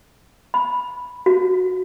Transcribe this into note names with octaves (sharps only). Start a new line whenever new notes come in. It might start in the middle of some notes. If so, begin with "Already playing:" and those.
B5
F#4